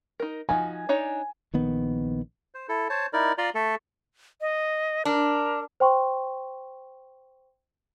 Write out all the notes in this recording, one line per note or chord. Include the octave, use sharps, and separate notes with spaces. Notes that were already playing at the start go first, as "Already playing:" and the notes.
D#4 A#4
F3 D#4 F#4 G#5
D4 D#4 C#5
A#1 D#3 B3
C5
E4 A4
C5 C#5 A5
D#4 E4 A#4 D5
F4 D5 A#5 C6
A3 A4
D#5
D4 A#4
C5 G5 C6 C#6